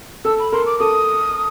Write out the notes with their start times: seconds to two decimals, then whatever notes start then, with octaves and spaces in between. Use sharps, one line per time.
0.25 A4 E6
0.39 B5
0.52 A#4 C6
0.66 D6
0.80 A4 D#6